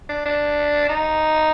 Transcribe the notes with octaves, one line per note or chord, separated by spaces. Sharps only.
D4
D4
D#4